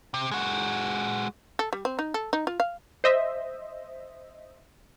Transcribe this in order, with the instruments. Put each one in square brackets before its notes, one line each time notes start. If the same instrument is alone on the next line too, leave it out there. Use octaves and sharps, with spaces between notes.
[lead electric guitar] C3
G#3 F#4
[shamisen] A4
G3
C4
D#4
A4
D#4
F4
F5
[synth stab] C5 D#5 E5